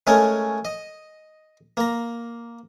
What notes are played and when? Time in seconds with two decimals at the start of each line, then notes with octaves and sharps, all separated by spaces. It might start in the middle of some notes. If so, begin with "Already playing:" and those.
0.07 G#3 A3 C#4 A#4 C#5
0.65 D#5
1.77 A#3 A#5